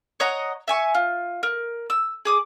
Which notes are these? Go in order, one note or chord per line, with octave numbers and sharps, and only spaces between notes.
C#5 D#5 F#5 A#5
E5 G#5 C#6
F4
A#4
E6
G#4 D6 D#6